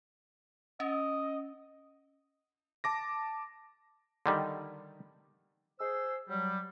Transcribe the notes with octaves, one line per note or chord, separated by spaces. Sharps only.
C#4 D#5
A5 D6 A#6
D3 D#3 G3
G#4 C5 E6
F#3 G3